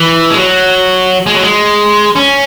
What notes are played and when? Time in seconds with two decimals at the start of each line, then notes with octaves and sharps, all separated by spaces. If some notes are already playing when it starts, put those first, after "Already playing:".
Already playing: E3
0.30 G#3
0.36 F#3
1.26 G#3
1.35 F#3
1.43 G#3
2.16 C#4